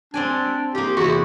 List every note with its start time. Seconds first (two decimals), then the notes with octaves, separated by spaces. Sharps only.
0.14 C4 D4 D5 G#5
0.75 A#3 F4 G4
0.97 E2 C3 F#4